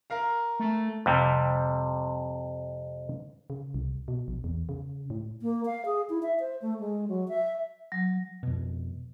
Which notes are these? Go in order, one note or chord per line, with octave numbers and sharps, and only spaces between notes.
A#4 F5 A#5
A3
F2 C3 G3
C#3
C2
B2
A#1
E2
C#3
A2
A#3
F5
G#4
E4
E5
C5
A3
G#3
F#3
E5
F#3
F2 B2